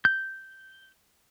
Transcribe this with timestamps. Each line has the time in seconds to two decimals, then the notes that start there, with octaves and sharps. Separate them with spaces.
0.05 G6